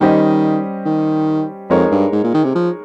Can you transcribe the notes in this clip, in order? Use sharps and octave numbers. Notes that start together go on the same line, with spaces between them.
D#3 G3 C#4 G4 C5 D#5
D#3
F2 G#3 D#4 A#4 C#5
G2
G#2
A#2
D#3
C3
F3